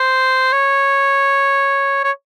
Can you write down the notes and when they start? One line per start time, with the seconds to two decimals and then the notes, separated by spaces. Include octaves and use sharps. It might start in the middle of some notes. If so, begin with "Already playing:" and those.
Already playing: C5
0.52 C#5
2.04 C#5